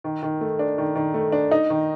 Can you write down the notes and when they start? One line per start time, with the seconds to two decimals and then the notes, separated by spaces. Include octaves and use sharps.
0.04 D#3
0.23 D#3
0.41 A3
0.59 D4
0.78 D#3
0.96 D#3
1.14 A3
1.32 D4
1.51 D#4
1.70 D#3